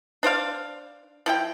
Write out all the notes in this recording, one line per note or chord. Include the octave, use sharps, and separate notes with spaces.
D4 C5 D5 F5
F3 E4 G5